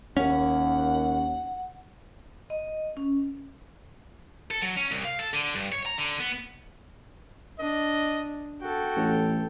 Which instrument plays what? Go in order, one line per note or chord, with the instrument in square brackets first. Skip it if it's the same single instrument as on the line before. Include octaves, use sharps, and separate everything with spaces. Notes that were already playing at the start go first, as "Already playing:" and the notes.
[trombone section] D#2 [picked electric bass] C#4 [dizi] F#5
[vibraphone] D#5
C#4
[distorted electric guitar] A4
F#3
C#4
C2
F5
A4
D3
G2
C#5
A#5
D3
B3
[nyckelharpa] D4 [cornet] D#5
[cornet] F#4 [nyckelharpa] A4 G5
[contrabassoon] A1